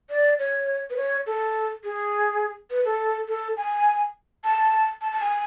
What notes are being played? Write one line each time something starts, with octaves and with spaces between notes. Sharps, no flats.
D5
C#5
B4
C#5
A4
G#4
B4
A4
A4
G#5
A5
A5
A5
G#5